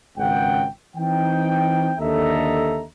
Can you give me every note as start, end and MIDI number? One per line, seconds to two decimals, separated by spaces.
0.18 0.67 32
0.18 0.67 37
0.18 0.67 49
0.18 0.67 78
0.18 0.67 79
0.96 1.94 52
0.96 1.94 60
0.96 1.94 63
0.96 1.94 79
1.99 2.84 39
1.99 2.84 50
1.99 2.84 69
1.99 2.84 75
1.99 2.84 76
1.99 2.84 82